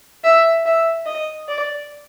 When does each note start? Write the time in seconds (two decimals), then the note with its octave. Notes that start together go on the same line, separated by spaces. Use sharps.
0.24 E5
0.66 E5
1.06 D#5
1.48 D5